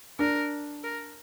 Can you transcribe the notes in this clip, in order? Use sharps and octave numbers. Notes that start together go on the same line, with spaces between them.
D4 A#4
A#4